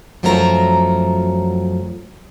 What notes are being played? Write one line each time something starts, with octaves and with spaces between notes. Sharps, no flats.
F#2 F3 F#3 A3 A#4 A#5